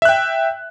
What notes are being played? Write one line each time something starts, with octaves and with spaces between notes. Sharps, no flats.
E5 G5 F#6